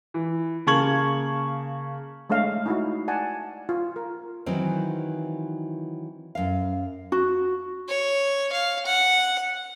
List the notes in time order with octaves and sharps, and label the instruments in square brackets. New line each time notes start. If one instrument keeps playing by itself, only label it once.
[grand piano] E3
C#3 A#3 A5 C#6 G#6 F#7
[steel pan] G#3 A3 D4 C#5 F5
D#4 E4 F#4
D5 F#5 G#5 A5
F4
A#4
[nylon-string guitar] D#3 E3 F#3 C4 D#4
F#2 F5
[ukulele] F#4
[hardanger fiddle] C#5
F5
F#5